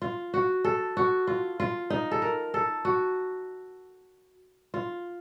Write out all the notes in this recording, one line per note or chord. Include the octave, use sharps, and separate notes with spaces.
F4
F#4
A4
F#4
F4
F4
D#4
A4
A#4
A4
F#4
F4